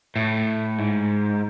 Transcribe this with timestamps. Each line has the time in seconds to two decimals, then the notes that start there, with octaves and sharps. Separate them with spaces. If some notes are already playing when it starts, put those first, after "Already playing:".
0.16 A2
0.78 G#2